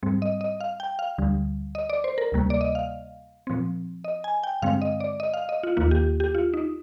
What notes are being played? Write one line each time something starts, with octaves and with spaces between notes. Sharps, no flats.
G#2 G3 C4
D#5
D#5
F5
G5
F5
D2 D3 G3
D#5
D5
C5
A#4
D2 C3 G3 A#3
D5
D#5
F5
A#2 F3 C4
D#5
G#5
G5
G2 D3 G#3 C4 F5
D#5
D5
D#5
F5
D#5
F4
D#2 D#3 A#3 F4
G4
G4
F4
D#4